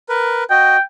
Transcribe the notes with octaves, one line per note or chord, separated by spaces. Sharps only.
A#4 B4
F#4 D#5 G5